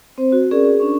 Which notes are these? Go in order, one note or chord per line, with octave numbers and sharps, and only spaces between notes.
C4 C5
F#4
C#4 G#4 A#4 D5
G#4
C#4 D4 C#6